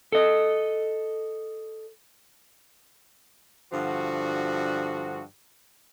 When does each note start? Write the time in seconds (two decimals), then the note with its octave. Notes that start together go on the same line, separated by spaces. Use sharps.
0.12 A4 D#5
3.73 G2 D3 F3 F#4